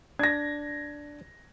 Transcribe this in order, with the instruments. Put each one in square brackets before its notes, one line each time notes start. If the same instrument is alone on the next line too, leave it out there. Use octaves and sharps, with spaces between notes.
[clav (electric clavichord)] D4 [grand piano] G#6 A#6